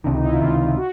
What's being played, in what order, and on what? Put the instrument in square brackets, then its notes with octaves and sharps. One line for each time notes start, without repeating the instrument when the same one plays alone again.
[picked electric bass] C#2 C3 D#3 [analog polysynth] D4
[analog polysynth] D#4
E4
F4
[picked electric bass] C#2 C3 D#3
[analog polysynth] F#4